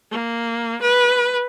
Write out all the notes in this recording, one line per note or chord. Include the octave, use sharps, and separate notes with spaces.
A#3
B4